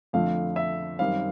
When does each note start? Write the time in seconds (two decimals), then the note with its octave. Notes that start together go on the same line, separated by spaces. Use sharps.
0.13 F2 D3 F3 A3 F5
0.56 E5
0.99 F#2 D#3 G3 C4 F5